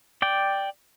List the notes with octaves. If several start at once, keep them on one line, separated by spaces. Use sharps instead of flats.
D5 G5